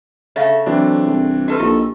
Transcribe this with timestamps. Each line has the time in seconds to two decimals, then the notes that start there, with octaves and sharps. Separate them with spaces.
0.36 C#3 A3 C#5 E5 F5
0.66 E3 F#3 C4 D4
1.07 C2
1.48 D#4 F#4 G4 A4 B4
1.60 A#1 E4 F4 G4